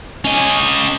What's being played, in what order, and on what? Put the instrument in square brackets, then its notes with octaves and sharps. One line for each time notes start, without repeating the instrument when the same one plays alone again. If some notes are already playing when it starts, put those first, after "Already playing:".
[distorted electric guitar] C#4 D#5